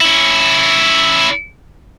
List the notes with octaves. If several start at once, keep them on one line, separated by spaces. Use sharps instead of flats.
C#4 E4